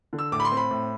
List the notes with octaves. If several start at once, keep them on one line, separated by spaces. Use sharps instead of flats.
D3
E6
A2 D6
B5
C6
C4
B5
A2